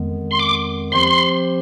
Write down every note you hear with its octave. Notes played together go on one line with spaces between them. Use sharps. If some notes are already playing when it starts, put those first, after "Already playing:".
Already playing: F2 D#3 G#3 B3
C6
D6
F3 C4 G4 C5 C6